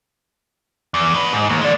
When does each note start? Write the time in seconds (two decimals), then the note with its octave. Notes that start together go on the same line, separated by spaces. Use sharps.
0.94 E2
1.14 D#3 B4
1.32 G#2
1.49 D#2
1.61 G#3 D5